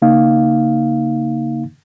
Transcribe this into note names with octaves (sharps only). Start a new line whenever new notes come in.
C#3 A#3 D#4 F5